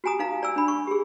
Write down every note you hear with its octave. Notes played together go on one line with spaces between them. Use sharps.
F#4 G4 G#5 A#5 D#6
D#4 F5 A#5
D5 G#5 E6
D4 B5
C#6
G4 G#4